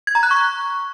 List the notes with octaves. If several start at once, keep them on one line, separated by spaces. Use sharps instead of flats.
G#6
A#5
F#6
C#6